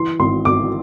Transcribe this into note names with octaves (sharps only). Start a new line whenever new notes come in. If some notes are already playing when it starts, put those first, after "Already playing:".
Already playing: E3 C6
G#1 C6
G#1 D6